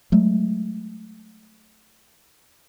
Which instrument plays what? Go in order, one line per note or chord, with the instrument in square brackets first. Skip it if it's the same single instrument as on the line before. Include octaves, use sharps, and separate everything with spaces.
[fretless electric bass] F#3 G#3 A3